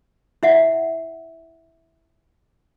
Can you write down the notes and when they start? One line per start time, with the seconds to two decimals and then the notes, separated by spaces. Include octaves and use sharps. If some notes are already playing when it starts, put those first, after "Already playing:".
0.43 E4 E5 F#5